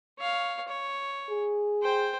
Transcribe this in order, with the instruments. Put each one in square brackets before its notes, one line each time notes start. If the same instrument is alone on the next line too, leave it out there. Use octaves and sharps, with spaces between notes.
[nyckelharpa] C#5 F5
C#5
[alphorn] G#4
[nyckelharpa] C5 G5